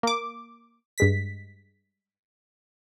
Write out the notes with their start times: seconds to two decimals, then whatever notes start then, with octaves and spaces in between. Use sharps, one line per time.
0.03 A#3 D6
0.98 G2 G#3 B6